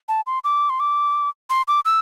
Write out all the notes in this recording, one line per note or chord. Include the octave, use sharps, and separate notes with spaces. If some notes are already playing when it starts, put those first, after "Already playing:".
A5
C6
D6
C6
D6
C6
D6
E6